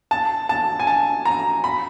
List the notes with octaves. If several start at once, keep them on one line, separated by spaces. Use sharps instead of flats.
A5
A5
G#5
A5
A#5
B5